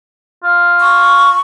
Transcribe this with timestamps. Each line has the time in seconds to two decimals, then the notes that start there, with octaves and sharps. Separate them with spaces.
0.43 F4
0.80 C#6